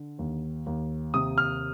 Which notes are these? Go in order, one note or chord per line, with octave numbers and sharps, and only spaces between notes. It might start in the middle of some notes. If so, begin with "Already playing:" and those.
Already playing: D3
D#2
D#2
C3 D#6
F6